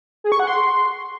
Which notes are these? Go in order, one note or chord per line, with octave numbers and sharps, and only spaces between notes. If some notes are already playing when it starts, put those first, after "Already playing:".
G#4
C#6
F#5
C6